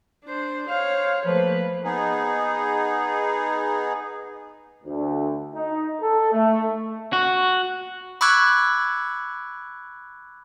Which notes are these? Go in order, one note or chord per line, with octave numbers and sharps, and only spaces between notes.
D4 C5
C5 C#5 F5
F3 A3 A#3 B4
B3 D#4 G#4
D2
D#4
A4
A3
F#4
B5 C#6 D6 E6 F#6 G#6